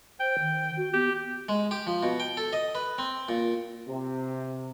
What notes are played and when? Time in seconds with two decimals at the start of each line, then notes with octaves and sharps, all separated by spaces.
0.20 C5 G5
0.40 D#3
0.77 F#4
0.94 B3 G4
1.49 G#3
1.71 G4
1.87 F3
2.03 B2
2.20 G5
2.37 A4
2.53 D#5
2.75 B4
2.98 C4
3.29 A#2
3.87 C3